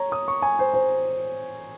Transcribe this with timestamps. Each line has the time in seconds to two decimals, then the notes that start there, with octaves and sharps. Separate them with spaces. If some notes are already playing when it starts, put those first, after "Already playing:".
Already playing: C#5 A#5
0.12 D#6
0.28 C#6
0.42 G#5
0.59 C5
0.74 C5